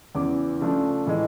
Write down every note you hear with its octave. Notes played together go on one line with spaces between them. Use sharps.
E2 C#3 E3 D6
C#3 F3 A3 D4
A2 E3 G#3